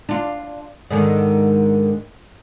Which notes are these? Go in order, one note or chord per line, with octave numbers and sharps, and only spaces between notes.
D4 F4
G#2 D3 D#3